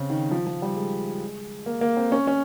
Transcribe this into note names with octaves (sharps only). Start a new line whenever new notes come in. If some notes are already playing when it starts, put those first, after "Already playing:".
Already playing: C#3 C4
D#3
F3
F3
G3
G#3
A#3
A#3
C4
C#4
C#4